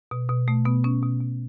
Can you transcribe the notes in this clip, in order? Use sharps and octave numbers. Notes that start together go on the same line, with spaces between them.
B2
B2
B2 A3
B2 B3
B2 C#4
B2
B2